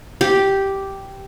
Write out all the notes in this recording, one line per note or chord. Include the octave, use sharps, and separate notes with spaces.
G4